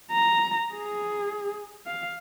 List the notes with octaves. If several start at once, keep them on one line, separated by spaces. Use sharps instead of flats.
A#5
G#4
F5